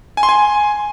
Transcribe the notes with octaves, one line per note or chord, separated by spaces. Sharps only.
G#5
C6
G#5